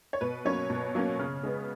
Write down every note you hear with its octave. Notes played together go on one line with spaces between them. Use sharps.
C#5
B2 B4
F#3 A#3 C#4 C#5
B2
F#3 A#3 C#4
C#3
G#3 B3